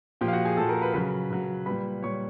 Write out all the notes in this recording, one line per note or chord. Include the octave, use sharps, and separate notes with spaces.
A#2 F3 G4 G5
F5
F#4 F#5
G#4 G#5
A#2 F3 A4 A5
A#4 A#5
B4 B5
C#3 F#3 B4 B5
C#3 F#3
A#2 G3 B4 B5
A#2 G3 C#5 C#6